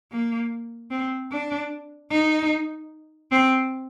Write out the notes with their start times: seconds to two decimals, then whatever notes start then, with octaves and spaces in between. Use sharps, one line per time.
0.11 A#3
0.91 C4
1.32 D4
2.11 D#4
3.31 C4